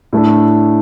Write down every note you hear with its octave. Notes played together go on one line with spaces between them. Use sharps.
A2 A3 D4